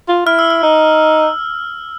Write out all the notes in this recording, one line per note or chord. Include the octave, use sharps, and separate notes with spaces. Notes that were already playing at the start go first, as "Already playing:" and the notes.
F4
E4 F6
E6
F6
D#4